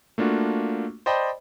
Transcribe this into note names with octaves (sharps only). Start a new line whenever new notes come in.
A3 A#3 D4 F4 F#4
C5 D5 D#5 G5 A5 B5